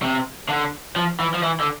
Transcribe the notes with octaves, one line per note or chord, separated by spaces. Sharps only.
C3
D3
F3
E3
F3
E3
D3